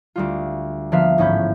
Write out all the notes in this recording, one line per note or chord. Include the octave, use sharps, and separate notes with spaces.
D2 G3 F4
D3 F3 A#3 B3 E5 F5
A1 G#2 C#4 B5 G6